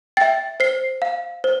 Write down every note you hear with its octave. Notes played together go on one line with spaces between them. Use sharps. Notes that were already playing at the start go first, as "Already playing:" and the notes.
E5 G5 A6
C5 C7
F5
C5